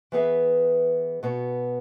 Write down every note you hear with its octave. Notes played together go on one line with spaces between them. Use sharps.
E3 B3 G#4 B4 E5
B2 B3 F#4